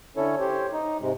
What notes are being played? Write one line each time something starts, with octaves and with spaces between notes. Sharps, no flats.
D3 C#4 E4 A4 C#5
G4 C5 C#5
D#4
G#2 C3 G#3